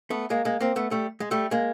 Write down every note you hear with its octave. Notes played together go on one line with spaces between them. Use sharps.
A3 B3
G#3 A#3
G#3 A#3
A#3 C4
A3 B3
G3 A3
G#3
G3 A3
G#3 A#3